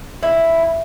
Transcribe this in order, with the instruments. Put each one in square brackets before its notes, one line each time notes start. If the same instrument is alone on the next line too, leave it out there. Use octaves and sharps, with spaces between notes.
[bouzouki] E4